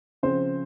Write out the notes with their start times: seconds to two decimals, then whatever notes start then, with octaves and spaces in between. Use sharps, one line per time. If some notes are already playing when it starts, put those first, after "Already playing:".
0.23 C#3 F3 C4 C5